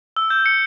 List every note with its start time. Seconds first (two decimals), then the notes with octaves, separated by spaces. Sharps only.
0.17 E6
0.30 G6
0.46 C#7